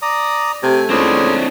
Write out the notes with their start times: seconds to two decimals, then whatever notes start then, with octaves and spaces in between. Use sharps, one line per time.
0.02 D5 A#5 D#6
0.63 C3 A3 G#5
0.90 C#2 C4 D4